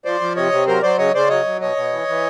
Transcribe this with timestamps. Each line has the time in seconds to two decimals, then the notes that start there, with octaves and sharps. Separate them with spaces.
0.05 F3 C5 D5
0.21 F3
0.36 C3 C#5 D#5
0.52 C3
0.67 F#3 A#4 C5
0.83 F#3 C5 D5
0.98 C#3 C#5 D#5
1.14 C#3 C5 D5
1.29 F#3 C#5 D#5
1.46 F#3
1.61 B2 C#5 D#5
1.76 B2
1.93 E3
2.08 E3